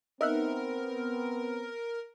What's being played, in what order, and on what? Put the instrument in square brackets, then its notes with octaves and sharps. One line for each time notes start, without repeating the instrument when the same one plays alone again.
[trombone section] B3 C4 [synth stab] D#4 E5 F#5 [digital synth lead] A#4